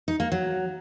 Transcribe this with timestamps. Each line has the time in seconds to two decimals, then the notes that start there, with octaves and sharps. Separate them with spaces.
0.08 D#4
0.20 A#3
0.32 F#3